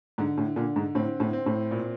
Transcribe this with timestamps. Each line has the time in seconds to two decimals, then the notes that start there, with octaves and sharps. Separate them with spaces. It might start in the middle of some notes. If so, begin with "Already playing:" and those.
0.18 G#2 D3
0.38 A2
0.56 A#2 D3
0.76 G#2
0.95 A2 C4
1.20 A2
1.33 C4
1.46 A2
1.71 A#2